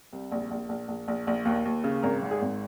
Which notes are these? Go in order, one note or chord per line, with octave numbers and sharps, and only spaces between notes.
C2
A#1
A#1
A#1
A#1
A#1
A#1
D#2
D#2
C#3
G#1 A#4
G#2
G#4
G#1